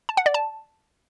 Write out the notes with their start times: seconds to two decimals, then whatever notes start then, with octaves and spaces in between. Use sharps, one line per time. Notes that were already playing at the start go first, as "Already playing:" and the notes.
0.09 A5
0.17 F#5
0.26 D5
0.34 A5